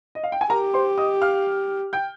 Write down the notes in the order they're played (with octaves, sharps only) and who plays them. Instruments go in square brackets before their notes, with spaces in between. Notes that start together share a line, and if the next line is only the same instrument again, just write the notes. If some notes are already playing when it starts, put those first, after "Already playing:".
[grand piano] D#5
F5
G5
G#5
[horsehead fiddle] G4 [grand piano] A#4 A#5
[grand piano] C5 C6
D#5 D#6
F5 F6
G5 G6